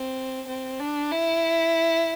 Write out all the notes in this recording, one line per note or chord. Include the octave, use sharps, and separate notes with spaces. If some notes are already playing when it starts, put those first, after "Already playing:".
Already playing: C4
C4
D4
E4